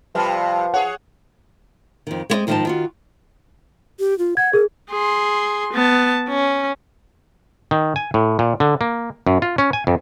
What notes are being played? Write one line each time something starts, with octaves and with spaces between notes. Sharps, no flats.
C3 F3 G3 B4 F5 A5
G#4 C#5 F#5
F2 D#3
G#3 B3 C4 B4 D5 D#5
G#2 D#3 F3 D#4 C5 A5
D#3 F4 F#4
G4
F4
F#5 G#6
G#4 A#4
G#4 C6
B3 A5
C#4
D#3
G#5
A2
A#2
D3
A#3
F#2
F4
C#4
G#5
F2